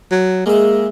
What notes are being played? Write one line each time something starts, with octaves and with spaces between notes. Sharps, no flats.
F#3
G#3 A#3 E5